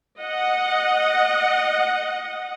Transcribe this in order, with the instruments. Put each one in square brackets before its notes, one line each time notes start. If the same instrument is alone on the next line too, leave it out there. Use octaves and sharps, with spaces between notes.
[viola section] D#5 F#5